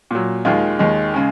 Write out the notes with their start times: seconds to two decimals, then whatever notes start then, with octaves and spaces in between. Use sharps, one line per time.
0.11 A#2 F#3
0.45 D#2 D#3 G#3 F4
0.79 D#2 D#3 G#3
1.14 C#3 G#3